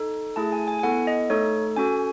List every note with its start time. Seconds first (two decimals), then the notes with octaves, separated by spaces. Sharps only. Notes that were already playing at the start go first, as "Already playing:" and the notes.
Already playing: D#4 A4
0.36 A3 E4 G#4 A5
0.52 G#5
0.68 G#5
0.79 G#5
0.83 B3 E4 A4 F#5
1.07 D#5
1.30 A3 D#4 A4 C#5
1.77 C#4 F#4 A4 G#5